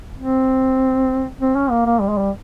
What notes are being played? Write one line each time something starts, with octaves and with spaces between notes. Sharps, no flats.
C4
C4
C#4
A#3
A#3
G3
G#3
G3